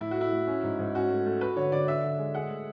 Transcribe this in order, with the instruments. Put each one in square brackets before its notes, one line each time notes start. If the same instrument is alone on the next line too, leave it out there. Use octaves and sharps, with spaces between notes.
[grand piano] A2 [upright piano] E4
[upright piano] F#4
[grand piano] A3 [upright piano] E4
[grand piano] A3
C#4
G#2
G#2
[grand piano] C#4 [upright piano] F#4
[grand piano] A3
A3
[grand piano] F#4 [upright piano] B4
[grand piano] D3 [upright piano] C#5
[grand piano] D3 [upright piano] D5
[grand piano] D4 [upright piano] E5
[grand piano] D3
G#3
[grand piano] G#4 [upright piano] F#5
[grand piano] A3